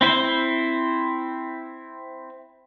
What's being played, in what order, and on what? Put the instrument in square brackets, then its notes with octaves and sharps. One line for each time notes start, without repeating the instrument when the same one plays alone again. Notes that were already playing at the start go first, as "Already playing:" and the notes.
[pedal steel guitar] C4 E4 C5